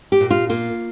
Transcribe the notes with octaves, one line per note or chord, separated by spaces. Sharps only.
G4
A#2
F4
A#3 F4